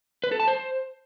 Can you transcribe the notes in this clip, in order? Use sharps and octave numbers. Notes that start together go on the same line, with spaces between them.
B4
A4
A5
C5